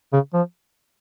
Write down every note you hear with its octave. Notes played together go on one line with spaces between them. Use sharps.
C#3
F3